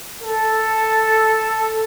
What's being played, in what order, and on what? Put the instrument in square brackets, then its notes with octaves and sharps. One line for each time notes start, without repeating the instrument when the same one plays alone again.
[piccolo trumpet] A4